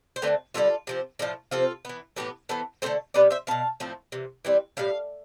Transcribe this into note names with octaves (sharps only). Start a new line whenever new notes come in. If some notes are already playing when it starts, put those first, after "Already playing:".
C5
D3 A3 C4 G4 B4
D3 G3 B3 F4 A4
C3 F3 C4
A2 F3 A3 D4 F4
C3 F3 C4 F4 A4
E3 B3
A2 E3 B3 G4 B4
E3 B3 A4 C5
D3 A3 C4 A4 C5
C3 G3 B3 B4 D5
C5 E5
B2 B3 F5 A5
A2 F3 A3 C4
C3 E3
E3 G3 C4
A2 G3 F5